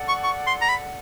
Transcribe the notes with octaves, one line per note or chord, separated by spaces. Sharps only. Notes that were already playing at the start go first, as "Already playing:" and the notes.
Already playing: A4 D5 F#5
C#6
C#6
C6
A#5
B5